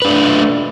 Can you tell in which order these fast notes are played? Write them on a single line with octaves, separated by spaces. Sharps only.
B4 D4 A3